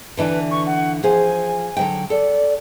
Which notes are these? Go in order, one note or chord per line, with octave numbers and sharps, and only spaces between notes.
D3 E3 D4 B4
C#6
F#5
F3 G#4 C5 G#5
D3 F#3 G5
A4 D5